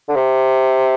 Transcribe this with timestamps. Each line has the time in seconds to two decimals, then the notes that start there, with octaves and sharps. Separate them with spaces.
0.08 D3
0.15 C3